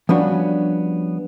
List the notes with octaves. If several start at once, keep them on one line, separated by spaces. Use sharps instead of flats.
F3 G3 B3 C#4 D4 F#4